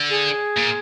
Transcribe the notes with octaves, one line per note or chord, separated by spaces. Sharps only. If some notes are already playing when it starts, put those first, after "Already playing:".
Already playing: D3
G#4
A#2